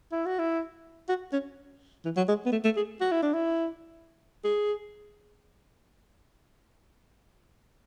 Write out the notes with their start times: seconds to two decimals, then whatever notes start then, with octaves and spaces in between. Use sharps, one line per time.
0.12 E4
0.26 F#4
0.39 E4
1.09 F#4
1.33 C#4
2.05 E3
2.17 F#3
2.29 G#3
2.46 B3
2.52 A3
2.64 A3
2.77 G#4
3.01 F#4
3.12 E4
3.23 D4
3.34 E4
4.44 G#4